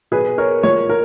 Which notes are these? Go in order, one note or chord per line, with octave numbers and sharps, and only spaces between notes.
B2 F#3 G#4 B4
A#4 C#5
A#2 F3 G#3 A#4 C#5
A#4